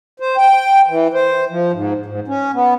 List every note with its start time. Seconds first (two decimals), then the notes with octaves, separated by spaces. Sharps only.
0.20 C5
0.37 G5
0.88 E3
1.14 C5
1.50 F3
1.73 G#2
2.06 G#2
2.28 C#4
2.54 B3